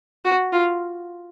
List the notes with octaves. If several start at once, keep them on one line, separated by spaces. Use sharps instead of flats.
F#4
F4